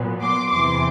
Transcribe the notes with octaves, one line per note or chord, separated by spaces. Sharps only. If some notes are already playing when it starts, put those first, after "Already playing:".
Already playing: A#2 F#3 B3
C6 D6
E2 C3 E3 C6 D6